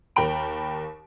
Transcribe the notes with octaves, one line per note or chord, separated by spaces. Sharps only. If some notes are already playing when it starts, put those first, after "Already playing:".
D#2 A#4 G5 A#5 B5 D7